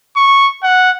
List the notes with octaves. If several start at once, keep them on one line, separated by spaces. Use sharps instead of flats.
C#6
F#5